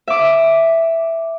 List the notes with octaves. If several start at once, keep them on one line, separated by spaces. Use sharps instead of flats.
E5 D6